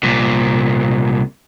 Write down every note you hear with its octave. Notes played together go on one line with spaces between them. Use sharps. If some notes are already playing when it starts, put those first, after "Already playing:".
C2 A#2